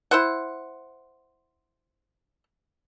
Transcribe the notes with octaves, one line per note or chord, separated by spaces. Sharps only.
E4 C5 F#5